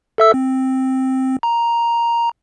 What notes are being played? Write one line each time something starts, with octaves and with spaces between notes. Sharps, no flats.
A4 E5 E6
C4
A#5